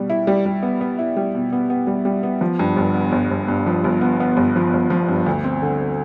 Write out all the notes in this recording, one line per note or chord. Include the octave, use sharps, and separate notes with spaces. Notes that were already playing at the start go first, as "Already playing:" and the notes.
Already playing: B2 G3
E4
G3
G3
B3
B3
E4
G3
B2
B3
B3
G3
G3
B3
F3
G2
G1
B3
G1
G1
G2
F3
G1
B3
B3
G1
F3
G1
F3
G2
D2
C4
D3